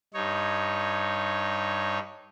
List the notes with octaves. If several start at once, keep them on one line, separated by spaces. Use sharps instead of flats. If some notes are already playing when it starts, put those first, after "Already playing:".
G2 D#4 C#5